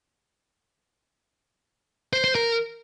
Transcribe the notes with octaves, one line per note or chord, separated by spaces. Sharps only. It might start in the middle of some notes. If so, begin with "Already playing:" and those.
C5
C5
A#4